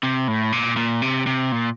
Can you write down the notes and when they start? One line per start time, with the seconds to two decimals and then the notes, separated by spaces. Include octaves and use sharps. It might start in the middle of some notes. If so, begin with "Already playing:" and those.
0.03 C3
0.28 A2
0.52 A#2
0.77 A#2
1.02 C3
1.27 C3
1.52 A#2